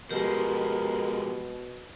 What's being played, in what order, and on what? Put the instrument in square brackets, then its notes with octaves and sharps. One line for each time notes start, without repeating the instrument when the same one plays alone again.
[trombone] B2 [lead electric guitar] F3 G#3 [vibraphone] G4 [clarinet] A#4